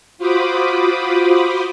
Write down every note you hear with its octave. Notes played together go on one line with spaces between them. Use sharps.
F4 F#4 C5 B5 D6 D#6